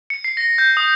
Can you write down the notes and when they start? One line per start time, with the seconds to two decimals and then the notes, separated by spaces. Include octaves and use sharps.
0.10 C#7
0.24 C7
0.37 A#6
0.58 G6
0.77 D#6